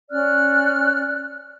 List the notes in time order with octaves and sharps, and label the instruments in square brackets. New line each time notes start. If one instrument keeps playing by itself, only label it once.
[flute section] C#4 D5 F6 F#6